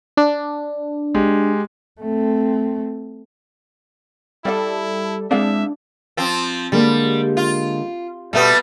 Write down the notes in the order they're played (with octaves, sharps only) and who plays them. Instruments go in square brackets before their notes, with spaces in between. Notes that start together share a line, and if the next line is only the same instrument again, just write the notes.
[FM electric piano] D4
[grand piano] G#3 G4
[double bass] A3 C4
[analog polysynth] G3 A4 [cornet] E4 [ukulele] D5 E5 F5
[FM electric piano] G#3 C4 [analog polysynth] D4 [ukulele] E4 G#4 F5 [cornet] E5
[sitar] F3 C4
[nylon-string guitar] D3 G#3 A#3 [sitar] G3
[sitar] F4
[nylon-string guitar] B2 [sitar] G3 A3 B3